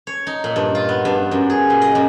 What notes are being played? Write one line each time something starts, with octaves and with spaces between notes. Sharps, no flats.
C#5
D#4
A#2
G2
F4
B3
G2
F#2
G#4
A#2
D#5
F#2